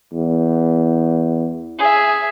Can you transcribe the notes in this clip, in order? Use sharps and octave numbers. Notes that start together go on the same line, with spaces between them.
E2
G#4 E5